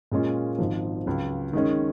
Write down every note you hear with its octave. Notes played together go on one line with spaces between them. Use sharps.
A#2 G#3 C#4 F4
G#1 G#2 F3
C#2 C#3 F#3 C#4
D#3 G#3 C#4